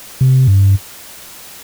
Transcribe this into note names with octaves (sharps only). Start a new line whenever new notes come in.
C3
G2